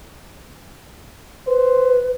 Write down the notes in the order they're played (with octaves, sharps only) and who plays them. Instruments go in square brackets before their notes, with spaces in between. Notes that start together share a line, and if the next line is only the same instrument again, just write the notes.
[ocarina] B4 [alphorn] C5